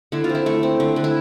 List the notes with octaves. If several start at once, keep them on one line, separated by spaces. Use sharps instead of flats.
D3 E4
F4
C4
E4
A3
C4
D3
D3
E4